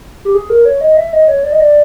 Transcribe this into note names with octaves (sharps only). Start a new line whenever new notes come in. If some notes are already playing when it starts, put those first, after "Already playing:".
G4
G#4
A#4
C#5
D#5
E5
D#5
C#5
D5
D#5
D5